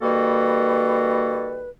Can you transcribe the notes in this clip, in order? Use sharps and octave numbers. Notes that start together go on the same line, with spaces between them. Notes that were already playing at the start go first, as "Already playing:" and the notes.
D#3 G3 A#3 F#4 A4 B4